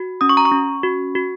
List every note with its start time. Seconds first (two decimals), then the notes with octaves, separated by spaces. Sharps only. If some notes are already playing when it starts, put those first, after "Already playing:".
Already playing: F#4
0.21 C#4 D#6
0.29 C#6
0.37 A#5
0.45 C#6
0.52 C#4
0.83 F#4
1.15 F#4